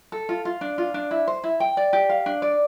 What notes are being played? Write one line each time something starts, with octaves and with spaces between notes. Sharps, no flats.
A4
F4
F4
D4
F4
D4
E4
C5
E4
G5
D5
G4
F5
D4
D5